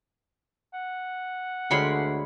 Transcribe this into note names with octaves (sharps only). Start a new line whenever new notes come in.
F#5
D2 D3 G#3 A#4 C#5 B5 C6